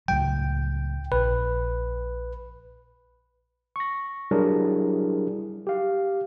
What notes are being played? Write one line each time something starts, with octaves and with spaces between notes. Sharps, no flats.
C#2 A2 F#3 G5
A#1 B4
C#6 A#6
F#3 G3 D4 E4 G#4 A#4
G4 F5